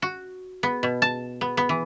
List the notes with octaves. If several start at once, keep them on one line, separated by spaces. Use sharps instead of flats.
F#4
B3
B2
A5
B3
B3
E3